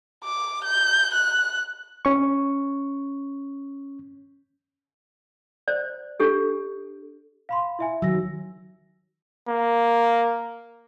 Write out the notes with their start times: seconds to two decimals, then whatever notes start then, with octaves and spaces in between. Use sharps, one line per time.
0.24 D6
0.64 G6
1.14 F#6
2.05 C#4 C#6
5.68 C5 D5
6.20 D4 G4 A4
7.49 F5 B5 C6
7.79 E4 E5 G#5
8.02 D#3 F#3 E6 A#6
9.48 A#3